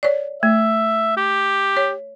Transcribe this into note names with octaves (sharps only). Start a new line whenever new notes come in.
C#5 D5
A3 E5
G4
C#5